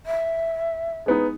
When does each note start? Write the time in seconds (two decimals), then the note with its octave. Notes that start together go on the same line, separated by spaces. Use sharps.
0.06 E5
1.06 G#3 B3 D#4